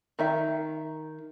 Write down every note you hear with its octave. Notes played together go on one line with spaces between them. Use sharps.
D#3 D#4 E5